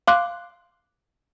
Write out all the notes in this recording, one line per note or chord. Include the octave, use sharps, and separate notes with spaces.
F5 C6 D6 F#6